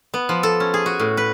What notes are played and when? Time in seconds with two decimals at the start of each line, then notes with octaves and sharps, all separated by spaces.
0.14 B3
0.29 F3
0.43 A4
0.60 C#4
0.74 G#4
0.86 F#4
1.00 A2
1.17 B4